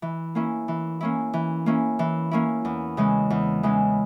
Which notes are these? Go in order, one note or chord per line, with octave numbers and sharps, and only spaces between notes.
E3
A#3 C#4 E4
E3
A#3 C#4 E4
E3
A#3 C#4 E4
E3
A#3 C#4 E4
E2
C#3 E3 G#3
E2
C#3 E3 G#3